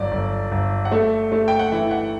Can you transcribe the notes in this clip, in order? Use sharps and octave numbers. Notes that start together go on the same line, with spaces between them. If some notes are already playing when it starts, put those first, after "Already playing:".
Already playing: G1 F#3 D5
G1
G1
F#5
A3 E5
A3
G5
F#5
E3 E5
F#5